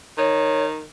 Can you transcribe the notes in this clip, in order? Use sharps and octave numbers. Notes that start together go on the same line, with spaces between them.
D#3 C#5